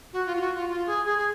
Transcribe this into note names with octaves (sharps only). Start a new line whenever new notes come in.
F#4
F4
F4
F#4
F4
F4
G#4
G#4
G#4